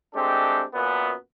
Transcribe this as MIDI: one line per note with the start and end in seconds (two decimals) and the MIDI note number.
0.15 0.63 56
0.15 0.63 57
0.15 0.63 60
0.15 0.63 62
0.15 0.63 67
0.15 0.63 69
0.74 1.13 42
0.74 1.13 46
0.74 1.13 59